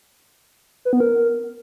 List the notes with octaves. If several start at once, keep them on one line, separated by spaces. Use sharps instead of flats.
B4
B3
A#4